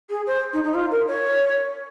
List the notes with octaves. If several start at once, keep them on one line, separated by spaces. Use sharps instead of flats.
G#4
C5
D#4
D#4
F4
A#4
C#5